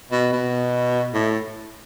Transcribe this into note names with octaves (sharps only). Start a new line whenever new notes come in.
B2
B2
A2